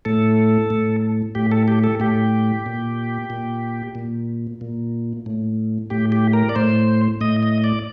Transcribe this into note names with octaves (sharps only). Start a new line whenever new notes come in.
A2 A4
A2
A2 G4
A4
G4
A4
A2 G4
A#2
A#2
A#2
A#2
A2
A2 G4
G4
A#4
D5
A2 C5
A2 D#5
D#5
D5